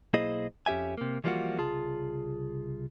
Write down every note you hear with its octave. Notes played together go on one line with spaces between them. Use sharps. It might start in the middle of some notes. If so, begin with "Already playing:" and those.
B1 A#3 E4 G#4 C5 D#5
F2 C#4 G4 E5 G#5
C3 A#3
E3 F3 G3 A#3 F4 F#4
C2 C#3 F4 G#4 A5